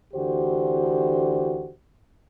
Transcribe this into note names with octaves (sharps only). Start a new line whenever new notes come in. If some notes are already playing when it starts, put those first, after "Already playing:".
D2 D3 E3 F#4 G4 C5